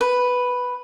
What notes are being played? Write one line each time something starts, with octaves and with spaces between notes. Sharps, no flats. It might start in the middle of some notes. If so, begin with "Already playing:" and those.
B4